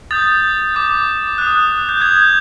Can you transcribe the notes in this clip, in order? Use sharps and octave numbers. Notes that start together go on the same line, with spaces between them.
D#6 G6 A6
D6 G6
D#6 F#6
G6
D#6 G6 G#6
G6